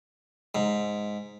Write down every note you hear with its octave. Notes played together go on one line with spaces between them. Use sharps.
G#2